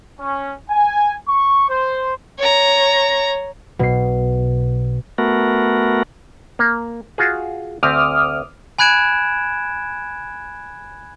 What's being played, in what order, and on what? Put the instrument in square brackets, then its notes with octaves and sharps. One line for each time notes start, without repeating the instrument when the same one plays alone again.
[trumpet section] C#4
G#5
C#6
C5
[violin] C#5 A#5
[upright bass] B1 [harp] B2 C7
[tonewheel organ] A3 B3 F#4 A#4
[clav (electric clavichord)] A#3
F4 F#4 G#4
[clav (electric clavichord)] D2 C4 E5 [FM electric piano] D6 D#6 F6
[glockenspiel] G#5 B5 F#6 G#6 D7 E7